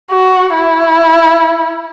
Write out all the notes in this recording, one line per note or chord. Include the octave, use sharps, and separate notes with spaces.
F#4
E4